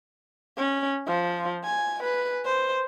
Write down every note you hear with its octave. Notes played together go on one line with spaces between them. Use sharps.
C#4
F3
G#5
B4
C5